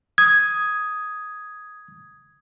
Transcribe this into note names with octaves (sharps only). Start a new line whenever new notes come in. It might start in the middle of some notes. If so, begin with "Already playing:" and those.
D#6 G#6